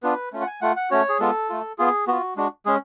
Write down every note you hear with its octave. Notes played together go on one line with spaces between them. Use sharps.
B3 D4 F4 B4
A3 C#4 F4
F#5
G#5
A3 F4 F#5
F#5
A3 C#4 F#4 C#5
G#4
G#3 B3 F4 A4
A3 F4
B3 F4 G#4
B3 F4 F#4
G#3 D4 F#4
G#3 C#4 G#4